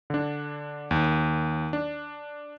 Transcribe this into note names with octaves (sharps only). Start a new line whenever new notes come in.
D3 D4
D#2
D4